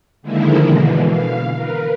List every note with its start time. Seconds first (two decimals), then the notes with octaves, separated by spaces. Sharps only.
0.22 D3 D#3 F3 G#3 A#3 E4
0.66 B2 D3 E3
1.06 F5
1.53 A#4 B4